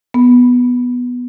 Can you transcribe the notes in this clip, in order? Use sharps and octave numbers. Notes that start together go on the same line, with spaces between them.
B3